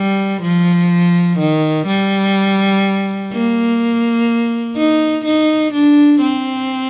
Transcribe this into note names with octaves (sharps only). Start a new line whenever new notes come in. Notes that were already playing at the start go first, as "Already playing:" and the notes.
Already playing: G3
F3
D#3
G3
A#3
D#4
D#4
D4
C4